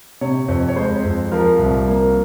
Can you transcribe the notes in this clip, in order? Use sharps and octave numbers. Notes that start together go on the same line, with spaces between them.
C3 C#5
F2
C#5
G#3 C5
F2
F3 A#4
C2
A#3